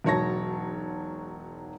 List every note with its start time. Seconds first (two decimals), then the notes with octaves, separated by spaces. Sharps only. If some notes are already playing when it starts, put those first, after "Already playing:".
0.04 E1 G#2 F#3 C#5 A5 A#6